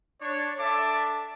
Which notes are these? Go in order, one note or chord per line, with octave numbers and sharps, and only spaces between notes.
D4 C#5
D4 A4 E5 A5 D6